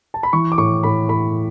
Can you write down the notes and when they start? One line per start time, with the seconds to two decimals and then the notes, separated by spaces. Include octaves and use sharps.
0.14 A5
0.23 B5
0.33 E3 C#6
0.52 D6
0.58 A2 C#6
0.83 A2 B5
1.09 A2 B5